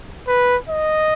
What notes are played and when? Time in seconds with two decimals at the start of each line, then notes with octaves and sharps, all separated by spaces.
0.27 B4
0.69 D#5